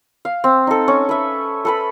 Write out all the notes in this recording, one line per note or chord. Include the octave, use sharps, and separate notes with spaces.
F5
C4
D#4 A4
C#4
B4 E5
A4 B4 B5